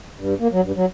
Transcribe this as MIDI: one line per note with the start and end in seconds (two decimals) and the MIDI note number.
0.19 0.34 43
0.40 0.48 58
0.52 0.61 54
0.64 0.72 43
0.77 0.86 54